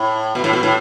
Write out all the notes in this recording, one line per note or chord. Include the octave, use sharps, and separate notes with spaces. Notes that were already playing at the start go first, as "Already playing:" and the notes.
Already playing: A2
B2
A2
B2
A2